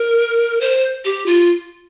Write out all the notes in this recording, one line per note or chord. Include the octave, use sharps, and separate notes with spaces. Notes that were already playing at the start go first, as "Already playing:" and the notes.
Already playing: A#4
C5
G4
F4